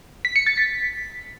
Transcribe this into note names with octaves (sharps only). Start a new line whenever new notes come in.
B6
C#7
A6
B6